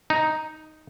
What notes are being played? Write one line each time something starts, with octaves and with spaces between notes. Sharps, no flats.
D#4